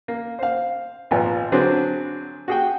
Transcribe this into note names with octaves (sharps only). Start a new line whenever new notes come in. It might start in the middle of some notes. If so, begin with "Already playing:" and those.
A#3
C5 F5
G#1 A#2 F3 B3 G#5
D3 F#3 C4 D4 G#4 B4
F#4 G#4 G5